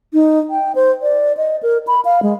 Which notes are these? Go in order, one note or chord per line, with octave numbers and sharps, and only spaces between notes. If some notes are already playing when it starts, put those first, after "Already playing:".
D#4
G5
C5
D5
D#5
A#4
B5
F5
G#3